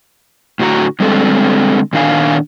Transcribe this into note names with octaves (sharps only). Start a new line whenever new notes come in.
A2 D3 F#4 C#5 A#5
D3 G3 G#3 C4 A4
A#2 D#3 D4 F5 G#5